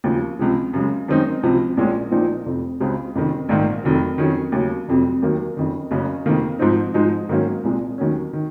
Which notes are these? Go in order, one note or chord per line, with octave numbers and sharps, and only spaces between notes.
D#2 C#3 F3
C#2 C3 F3 G#3
F#2 C#3 G#3
F#2 D#3 G#3 C4 D#4
C#2 C3 F3
A#1 A#2 G#3 C#4
A#1 A#2 F3 C4 D#4
F1 F2 C3
C#2 C#3 G#3 C4
F#1 F2 C3 D#3
A#1 G#2 D#3 A#3
F1 F2 D#3 F#3
F2 D#3 F#3 C#4
D#2 C#3 F#3 C#4
F1 F2 C3 F#3
D#2 D#3 F#3 A#3
F#1 F2 D#3
F#1 F#2 C#3
F2 C3 D#3 A#3
G#2 F3 C4 D#4
G#2 F3 G#3 D#4
G#2 D#3 F#3 A#3 C#4
C2 A#2 G#3
D#2 D#3 F#3 C#4
D#3